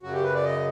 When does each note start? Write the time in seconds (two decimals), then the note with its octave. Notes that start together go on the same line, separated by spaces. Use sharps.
0.03 F#2 C#3 F#3 F#4
0.13 G4
0.24 B4
0.34 D5
0.44 D#5